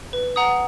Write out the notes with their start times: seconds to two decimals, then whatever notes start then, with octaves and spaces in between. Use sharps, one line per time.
0.13 B4
0.36 F#5 A#5 D#6